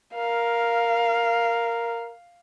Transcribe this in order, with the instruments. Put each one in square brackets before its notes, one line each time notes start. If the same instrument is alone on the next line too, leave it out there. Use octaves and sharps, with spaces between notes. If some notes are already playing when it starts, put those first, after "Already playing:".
[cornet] A#4 [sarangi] F5